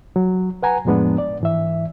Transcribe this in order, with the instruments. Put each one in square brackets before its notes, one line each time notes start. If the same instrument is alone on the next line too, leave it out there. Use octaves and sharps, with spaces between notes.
[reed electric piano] F#3
B4 F#5 G#5 A#5
F2 A2 F3 G#3 B3 D4
D5
G#2 E3 E5